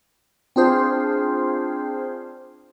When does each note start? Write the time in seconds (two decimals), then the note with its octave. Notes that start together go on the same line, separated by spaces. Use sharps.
0.56 C4 D4 F4 G#4 C5